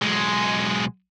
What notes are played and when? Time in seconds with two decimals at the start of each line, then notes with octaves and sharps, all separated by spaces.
0.02 B1 G#3